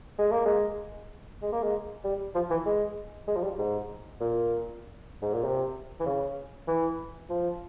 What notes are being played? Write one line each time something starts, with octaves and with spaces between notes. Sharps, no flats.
G#3
A#3
G#3
G#3
A#3
G#3
G3
F3
E3
G#3
G#3
F3
G3
G#2
A#2
G#2
A#2
C3
E3
C#3
E3
F3